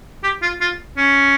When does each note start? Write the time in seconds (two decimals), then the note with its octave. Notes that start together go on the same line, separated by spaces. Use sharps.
0.23 G4
0.42 F4
0.61 F4
0.97 C#4